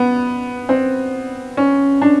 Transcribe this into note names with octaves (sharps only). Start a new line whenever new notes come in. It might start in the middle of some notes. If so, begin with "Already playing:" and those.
Already playing: B3
C4
C#4
D4